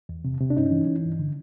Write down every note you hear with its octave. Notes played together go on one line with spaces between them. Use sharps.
E2
C3
C3
D4
G2 C#4 D#4
E3
E3
G2
D3